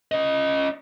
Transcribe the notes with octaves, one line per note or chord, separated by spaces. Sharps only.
C#4 D#5